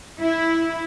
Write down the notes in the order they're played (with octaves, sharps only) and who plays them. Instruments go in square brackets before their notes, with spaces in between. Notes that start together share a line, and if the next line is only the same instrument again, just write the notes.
[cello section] E4